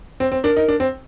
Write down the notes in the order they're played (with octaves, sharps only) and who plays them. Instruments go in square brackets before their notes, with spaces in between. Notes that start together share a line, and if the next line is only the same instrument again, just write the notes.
[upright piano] C4
C4
[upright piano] D4 [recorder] A#4
[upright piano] D#4
D4
C4